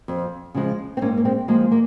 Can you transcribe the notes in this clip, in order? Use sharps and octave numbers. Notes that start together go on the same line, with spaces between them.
F2
C#3 F3 G#3
C4
G#2 A#3 C#4
A#3
G#3 C4
F3 G#3 A#3
A#3